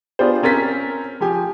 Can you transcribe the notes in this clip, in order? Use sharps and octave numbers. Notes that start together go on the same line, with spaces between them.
B3 D4 F4 G4 G#4 C5
C4 C#4 A#4 A6 B6
F3 G4 G#5